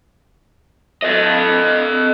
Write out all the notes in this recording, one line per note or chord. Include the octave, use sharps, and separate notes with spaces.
A4 D#5